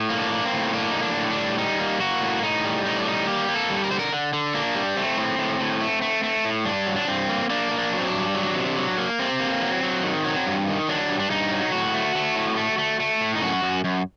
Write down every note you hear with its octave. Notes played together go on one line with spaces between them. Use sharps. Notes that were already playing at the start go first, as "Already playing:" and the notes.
Already playing: A2
A#3
D4
A#3
C4
A2
A#3 D4
A2 D#4
D4
A2
D4
G3
G3 D#4
A#3
A#3 F#4
A2
A2 D#4
G3
A2 D#4
D4
G3 D#4
A#3 G4
A#3
A4
G3
A#4
D3 C5
A#4
D3
D3
A#3 D4
G3
A3 C4
A2
A2
A2
A3
A3
A3
A2
G2 D4
F#3
D4
G2 C4
A#3
A#3 D4
A#3
D4
F#3
C4
D4
G2
F#3
C3
F#3
A#3
C3 C4
A#3
F#3
F#3
D#3
F#3
G2
D#3
F#3 D4
G2
D4
G2 D#4
F#3
A2 F#4
A3
A3
A2
A3
A3
A3
A2
D#4
F#2 F#4
F#2
F#2